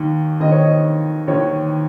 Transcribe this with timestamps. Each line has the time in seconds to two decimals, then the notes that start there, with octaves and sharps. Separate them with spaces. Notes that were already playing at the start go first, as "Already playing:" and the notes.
Already playing: D#2 D#3
0.40 D#2 D#3 D#5
0.51 C#5
0.63 D#5
1.27 D#2 D#3 C#5